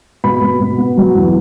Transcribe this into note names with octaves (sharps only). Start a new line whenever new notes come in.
B2 B5
B2
B2
B3
F#3
E2